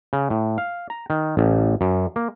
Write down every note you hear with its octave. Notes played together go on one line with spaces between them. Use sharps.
C#3
A2
F5
A#5
D#3
A1
F#2
A#3